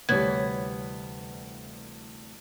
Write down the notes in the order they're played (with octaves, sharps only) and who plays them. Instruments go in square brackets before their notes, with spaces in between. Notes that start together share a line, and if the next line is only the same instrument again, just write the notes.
[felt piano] D2 G3 [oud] C3 E3 C#5 [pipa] B3 [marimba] G#6